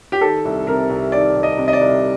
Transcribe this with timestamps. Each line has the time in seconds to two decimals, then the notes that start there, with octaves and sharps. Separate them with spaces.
0.12 G4
0.21 D#3 A4
0.45 C2
0.67 C3 A#4
0.89 C2
1.12 D#3 D5
1.35 C2
1.43 D#5
1.57 C3
1.68 D#5
1.73 D5
1.81 C2